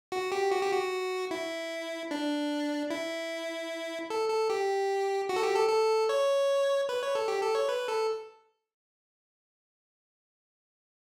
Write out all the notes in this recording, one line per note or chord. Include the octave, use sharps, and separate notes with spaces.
F#4
G4
F#4
G4
F#4
E4
D4
E4
A4
A4
G4
F#4
A4
G4
A4
A4
C#5
B4
C#5
A4
G4
A4
C#5
B4
A4